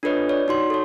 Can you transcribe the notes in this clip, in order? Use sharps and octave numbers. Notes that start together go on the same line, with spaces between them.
D4 F4 A4 B4 C#5 D#5
C#5 D5
D#4 F#4 C6
A4 C#5